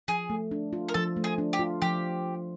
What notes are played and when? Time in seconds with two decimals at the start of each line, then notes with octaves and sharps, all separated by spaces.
0.08 F3 G#4
0.30 A3
0.51 D4
0.73 F4
0.89 A#4
0.94 F3 A4
1.16 A3
1.24 G#4
1.38 D4
1.53 G4
1.59 F4
1.82 F3 G4